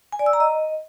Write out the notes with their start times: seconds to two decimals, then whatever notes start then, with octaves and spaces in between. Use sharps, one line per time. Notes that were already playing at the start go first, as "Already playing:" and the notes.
0.12 G#5
0.19 D5
0.26 E6
0.33 A#5
0.40 D#5